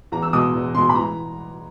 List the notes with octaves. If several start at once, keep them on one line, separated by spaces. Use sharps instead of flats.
E2 A#5
E6
B2 G#3 D#6
E2
B2 G#3 C6
B5
E3 A#5